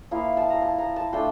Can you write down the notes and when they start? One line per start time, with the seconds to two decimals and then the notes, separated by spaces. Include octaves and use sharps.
0.11 F3 A#3 E4 F5
0.37 A5
0.50 A#5
0.62 A5
0.78 A#5
0.96 A5
1.12 A3 D4 F4 G5